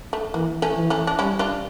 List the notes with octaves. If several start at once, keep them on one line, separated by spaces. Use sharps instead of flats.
A3
E3 A#3
A3 C#4
E3
A3 C#4
D4
G3 C#4 E4
D4 F4